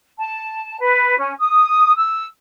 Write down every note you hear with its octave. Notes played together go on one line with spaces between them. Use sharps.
A5
B4
C#4
D#6
E6